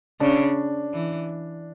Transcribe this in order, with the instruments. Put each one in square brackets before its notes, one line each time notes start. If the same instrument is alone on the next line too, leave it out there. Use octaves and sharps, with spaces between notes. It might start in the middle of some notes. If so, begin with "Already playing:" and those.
[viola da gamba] C#3 [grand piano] D4
[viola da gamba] E3